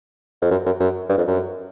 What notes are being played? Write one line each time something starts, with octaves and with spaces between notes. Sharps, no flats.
F2
F#2
F#2
F#2
G2
F2
F#2